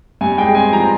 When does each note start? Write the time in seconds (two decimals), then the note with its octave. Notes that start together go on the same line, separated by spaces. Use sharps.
0.21 G2 G#5
0.38 G#3 G5
0.55 C4 G#5
0.72 F3 A#5